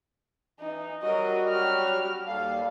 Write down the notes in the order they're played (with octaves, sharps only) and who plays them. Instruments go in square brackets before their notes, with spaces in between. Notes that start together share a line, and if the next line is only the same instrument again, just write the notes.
[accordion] E3 [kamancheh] D#4
[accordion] F#3 G3 F#4 [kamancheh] A#4 D#5
[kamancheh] G4 F6
[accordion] D#2 G3 F5 [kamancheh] A4